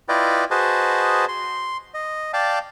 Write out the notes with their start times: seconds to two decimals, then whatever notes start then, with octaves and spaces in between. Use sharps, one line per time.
0.09 E4 F4 B4 D5 D#5 G5
0.51 F#4 G#4 B4 C5 D#5 A5
1.28 C6
1.94 D#5
2.33 D5 F5 G5 A5